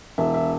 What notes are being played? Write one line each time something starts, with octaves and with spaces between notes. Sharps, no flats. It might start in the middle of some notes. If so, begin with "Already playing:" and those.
E1 E5
E5